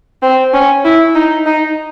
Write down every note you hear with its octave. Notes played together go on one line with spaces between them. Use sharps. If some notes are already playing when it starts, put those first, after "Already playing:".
C4
C#4
E4
D#4
D#4